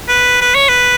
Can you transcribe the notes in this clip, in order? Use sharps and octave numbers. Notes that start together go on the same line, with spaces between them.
B4
B4
C#5
B4